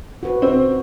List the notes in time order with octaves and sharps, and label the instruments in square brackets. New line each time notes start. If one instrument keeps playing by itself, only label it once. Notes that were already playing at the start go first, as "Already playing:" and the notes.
[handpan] F#4 B4 C5
[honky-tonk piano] C4